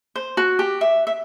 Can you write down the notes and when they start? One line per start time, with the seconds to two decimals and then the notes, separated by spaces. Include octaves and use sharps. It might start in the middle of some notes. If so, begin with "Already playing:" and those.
0.16 C5
0.37 F#4
0.59 G4
0.81 E5
1.07 E5